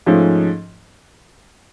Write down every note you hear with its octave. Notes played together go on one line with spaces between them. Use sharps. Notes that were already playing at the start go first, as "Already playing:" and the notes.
G#2 F3 A3 C#4